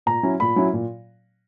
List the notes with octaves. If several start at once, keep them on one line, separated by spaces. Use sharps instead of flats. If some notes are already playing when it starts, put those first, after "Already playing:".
A#2 A#5
F#3 C#4 E4
A#2 B5
F#3 C#4 E4
A#2